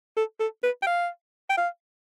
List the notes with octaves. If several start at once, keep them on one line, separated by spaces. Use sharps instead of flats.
A4
A4
B4
G5
F5
G5
F5